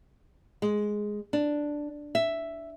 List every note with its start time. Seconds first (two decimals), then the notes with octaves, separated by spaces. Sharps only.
0.62 G#3
1.33 D4
2.15 E5